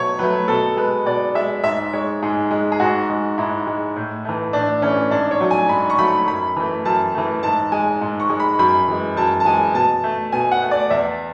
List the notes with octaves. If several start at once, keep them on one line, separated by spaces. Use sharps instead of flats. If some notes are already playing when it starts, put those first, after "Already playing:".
Already playing: B2 F#3 A3 C#5
F#3 A3 B4
B2 A4
G#3 B4
B2 D5
G#3 E5
G#2 E5
G#3 C#5
G#2 G#4
G#3
G#4
G#2 F#4
G#3
G#2 E4
G#3
A2
E3 A3
A2 D4
E3 A3 C#4
G#2 D4
C#5
F#3 A3
G#5
G#2 B5
C#6
F#3 A3 B5
F#2 B5
E3 A3
F#2 A5
E3 A3
G#2 A5
G#3 G#5
G#2
C#6
G#3
B5
F#2 B5
E3 G#3
F#2 A5
A5
E3 G#3 G#5
B2 A5
A3
B2 G#5
F#5
A3
D5
E2 E5